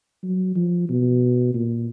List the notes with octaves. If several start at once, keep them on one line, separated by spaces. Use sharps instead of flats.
F#3
F3
B2
A#2